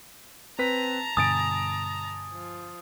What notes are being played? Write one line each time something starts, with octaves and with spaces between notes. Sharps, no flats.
C4 B4 A5 A#5 B6
G2 B2 D3 G#5 D#6 A6 D7
F3